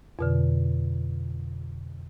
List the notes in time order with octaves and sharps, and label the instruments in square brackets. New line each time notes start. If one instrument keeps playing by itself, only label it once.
[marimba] F2 B2 D3